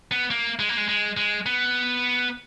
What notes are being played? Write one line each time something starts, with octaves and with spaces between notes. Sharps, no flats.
B3
A#3
G#3
A#3
G#3
G#3
G#3
B3